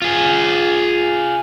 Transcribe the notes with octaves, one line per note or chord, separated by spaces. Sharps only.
F4 G#4